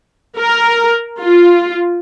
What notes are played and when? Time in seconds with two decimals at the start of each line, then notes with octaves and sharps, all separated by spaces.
0.38 A#4
1.21 F4